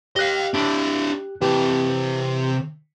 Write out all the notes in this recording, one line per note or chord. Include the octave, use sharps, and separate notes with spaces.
G4 D#5 F5 F#6
D4 E4
C3 E3 G4 A5